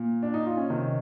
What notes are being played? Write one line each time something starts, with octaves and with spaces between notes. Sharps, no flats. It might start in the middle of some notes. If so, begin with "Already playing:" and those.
Already playing: A#2
D4
D#4
F4
C#4
C3 D#3